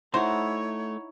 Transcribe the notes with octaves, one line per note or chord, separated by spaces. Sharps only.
A3 D#4 E4 F#4 C5 C#5 F#5 C6